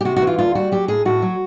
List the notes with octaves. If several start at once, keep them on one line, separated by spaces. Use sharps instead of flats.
G4
C3 F#4
F#4
E3
F4
D2 F4
G3 F#4
F#3 G4
A2 G#4
A2 F#4
F#3